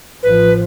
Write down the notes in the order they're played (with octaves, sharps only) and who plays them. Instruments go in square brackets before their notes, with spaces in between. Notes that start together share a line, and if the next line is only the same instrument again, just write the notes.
[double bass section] A1 A2 F3 [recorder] B4